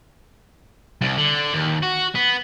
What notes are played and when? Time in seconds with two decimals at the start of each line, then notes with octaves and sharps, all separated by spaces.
1.01 C2
1.17 D3
1.54 D#2
1.83 F#4
2.15 B3